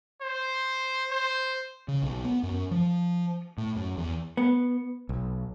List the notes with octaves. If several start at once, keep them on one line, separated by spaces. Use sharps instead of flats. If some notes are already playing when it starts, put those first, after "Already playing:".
C5
C5
C#3
B1
B3
F#2
F3
A2
F#2
E2
B3
B1